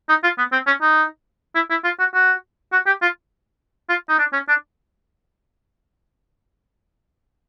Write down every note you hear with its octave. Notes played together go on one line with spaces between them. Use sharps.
D#4
F4
B3
C4
C#4
D#4
E4
E4
F4
F#4
F#4
F#4
G4
F4
F4
D#4
D4
C#4
D4